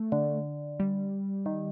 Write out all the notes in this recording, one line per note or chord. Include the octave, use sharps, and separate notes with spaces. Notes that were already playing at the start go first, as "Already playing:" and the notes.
Already playing: A3
D3
G3
D#3